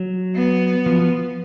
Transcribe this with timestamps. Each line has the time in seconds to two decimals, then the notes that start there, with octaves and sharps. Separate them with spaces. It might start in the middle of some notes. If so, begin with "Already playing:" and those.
Already playing: F#3
0.35 B3
0.86 F3